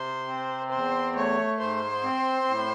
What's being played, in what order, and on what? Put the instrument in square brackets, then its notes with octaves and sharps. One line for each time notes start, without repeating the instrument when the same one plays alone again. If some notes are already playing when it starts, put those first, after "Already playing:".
Already playing: [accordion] C3 [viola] C5
[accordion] C4
[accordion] E2 [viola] C5
[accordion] A3 [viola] C#5
[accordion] G#2 [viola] C5
[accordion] C4
A2